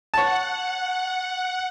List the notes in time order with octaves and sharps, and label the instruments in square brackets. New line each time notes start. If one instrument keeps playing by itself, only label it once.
[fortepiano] C#5 A5 [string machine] F#5